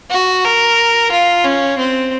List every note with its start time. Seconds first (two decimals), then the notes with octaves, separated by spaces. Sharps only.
0.11 F#4
0.45 A#4
1.11 F4
1.44 C#4
1.78 C4